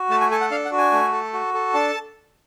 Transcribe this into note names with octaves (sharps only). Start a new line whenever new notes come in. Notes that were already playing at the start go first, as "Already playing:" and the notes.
Already playing: F#4
A3 A5
G#5
A4 G#5
F#5
D4 F5
F#5
F#4
G#5
A3
A4
F#4
A4
D4 A5